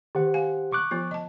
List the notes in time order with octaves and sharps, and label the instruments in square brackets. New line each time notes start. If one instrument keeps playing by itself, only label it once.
[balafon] D#3 [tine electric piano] G4 C5 F#5
[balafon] F5 G#5
[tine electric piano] C#6 D6 F#6
[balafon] F3 B3 F4
D#5 A5